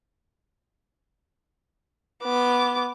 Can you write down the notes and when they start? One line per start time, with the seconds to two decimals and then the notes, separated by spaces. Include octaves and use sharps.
2.23 B3 D6